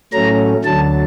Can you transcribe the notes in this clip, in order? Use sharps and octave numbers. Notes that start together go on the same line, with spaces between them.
A2 F#3 A3 C#4 A#5
D2 D3 F#3 A5